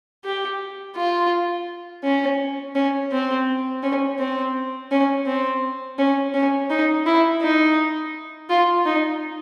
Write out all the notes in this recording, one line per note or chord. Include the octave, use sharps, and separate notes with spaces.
G4
F4
C#4
C#4
C4
C#4
C4
C#4
C4
C#4
C#4
D#4
E4
D#4
F4
D#4